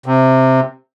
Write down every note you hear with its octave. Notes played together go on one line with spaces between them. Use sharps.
C3